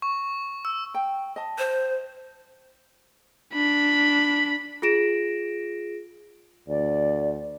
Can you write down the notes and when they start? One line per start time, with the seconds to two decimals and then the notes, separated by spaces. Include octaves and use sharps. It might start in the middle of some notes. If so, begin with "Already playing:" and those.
0.02 C#6
0.65 E6
0.94 G5
1.36 D#5 A5
1.58 C5
3.54 D4 B5
4.82 F4 G#4 A#6 D7 E7
6.69 D2 D5